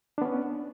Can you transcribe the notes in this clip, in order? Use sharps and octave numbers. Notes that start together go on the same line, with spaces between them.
B3 C#4 D4